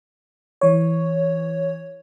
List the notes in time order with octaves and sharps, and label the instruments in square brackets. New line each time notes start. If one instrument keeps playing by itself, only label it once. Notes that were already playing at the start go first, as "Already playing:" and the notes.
[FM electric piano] E3 C#5